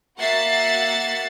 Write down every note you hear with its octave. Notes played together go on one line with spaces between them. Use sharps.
A#3 F#4 E5 F#5 A6 C7